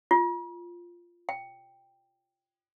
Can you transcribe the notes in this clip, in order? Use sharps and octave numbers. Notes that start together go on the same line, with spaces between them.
F4
G5